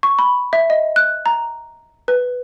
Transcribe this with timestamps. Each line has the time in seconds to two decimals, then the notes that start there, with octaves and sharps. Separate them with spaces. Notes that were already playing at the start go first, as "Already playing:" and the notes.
0.03 C#6
0.19 B5
0.53 E5
0.70 D#5
0.96 F#6
1.26 A#5
2.08 B4